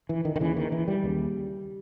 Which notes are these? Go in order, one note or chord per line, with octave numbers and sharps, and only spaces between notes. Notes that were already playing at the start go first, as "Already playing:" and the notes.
E3
D#3
D#3
D#2 C#3 E3
D#3
E3
G3
D#2 C#3